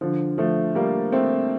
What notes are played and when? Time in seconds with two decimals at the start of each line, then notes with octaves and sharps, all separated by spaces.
0.01 D3 F3
0.38 F3 A3
0.75 G3 A#3
1.12 A3 C4